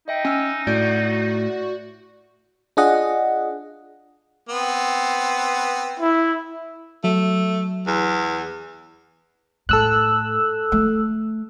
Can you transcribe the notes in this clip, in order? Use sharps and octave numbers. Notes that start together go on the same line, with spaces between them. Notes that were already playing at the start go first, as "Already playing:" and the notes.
D#4 D#5 E5 G5
C#4 G#5 E6 F6
A2 F#4 D5 G6 D7
D4 F4 G#4 D#5 F#5
B3 C4
E4
F#3 A3
E2
A2 A4 E6 F#6
A3